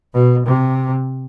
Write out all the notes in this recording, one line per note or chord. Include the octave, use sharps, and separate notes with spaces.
B2
C3